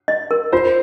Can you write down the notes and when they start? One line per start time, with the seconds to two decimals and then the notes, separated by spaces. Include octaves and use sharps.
0.08 D#5
0.31 A#4
0.52 F4 C5